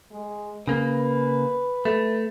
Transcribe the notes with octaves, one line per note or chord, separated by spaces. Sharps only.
G#3
C#3 A#3 B4
A3